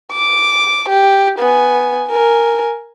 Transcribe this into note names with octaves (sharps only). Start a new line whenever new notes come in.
D6
G4
B3 G#5
A#4 G#5